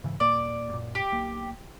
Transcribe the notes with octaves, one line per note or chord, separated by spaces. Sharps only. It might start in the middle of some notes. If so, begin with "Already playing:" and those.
G#2 C#3 E3
D#1 A#2 A#3 D5
F#2 A#2
G4
B1 A#3